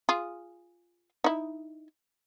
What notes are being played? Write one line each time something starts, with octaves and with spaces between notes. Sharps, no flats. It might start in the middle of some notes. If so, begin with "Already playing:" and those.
F4 G#4
D#4 E4